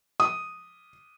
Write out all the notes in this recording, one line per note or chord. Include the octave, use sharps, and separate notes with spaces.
D#6